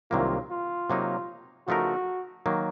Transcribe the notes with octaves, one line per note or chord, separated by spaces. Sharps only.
C2 C3 D#3 F#3 A#3 F4
F4
C3 F#3 A#3 D#4
C#3 F3 A3 D#4 F#4 A#4
D#3 F#3 A#3